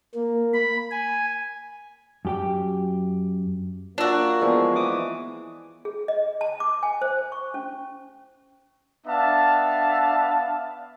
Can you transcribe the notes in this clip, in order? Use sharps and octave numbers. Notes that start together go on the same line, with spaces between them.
A#3
B5
G#5
F#2 G4 G5
A#3 D4 F4 F#4 E6
E3 F3 G#3 B3 C5 D5
E3 D6 D#6
G#4
D#5
A5
D6
G#5
C5
C#6
C#4
B3 D4 E5 F5 A5